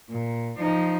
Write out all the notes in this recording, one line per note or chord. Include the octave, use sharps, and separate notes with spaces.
A#2
F3 D#4